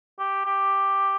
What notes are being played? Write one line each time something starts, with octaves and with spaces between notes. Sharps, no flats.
G4
G4